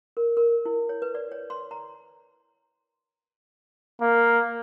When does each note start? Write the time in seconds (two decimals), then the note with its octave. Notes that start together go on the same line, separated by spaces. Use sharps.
0.17 A#4
0.37 A#4
0.65 E4
0.89 C#5
1.02 B4
1.15 D5
1.32 C#5
1.50 C6
1.71 A#5
4.01 A#3